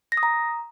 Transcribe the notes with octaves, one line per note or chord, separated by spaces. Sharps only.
A#6
D#6
A#5